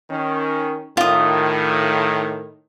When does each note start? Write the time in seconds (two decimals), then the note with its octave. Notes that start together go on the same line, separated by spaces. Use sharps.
0.10 D#3 C#4
0.97 A2 D#3 F4 D#6